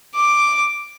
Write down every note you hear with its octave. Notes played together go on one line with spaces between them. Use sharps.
D6